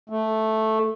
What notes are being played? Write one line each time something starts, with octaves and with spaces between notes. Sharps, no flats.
A3